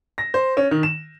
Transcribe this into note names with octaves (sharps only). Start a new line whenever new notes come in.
A#6
C5
C#4
D#3
E7